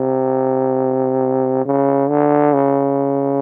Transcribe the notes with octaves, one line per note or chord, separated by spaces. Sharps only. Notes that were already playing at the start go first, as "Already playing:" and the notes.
Already playing: C3
C#3
D3
C#3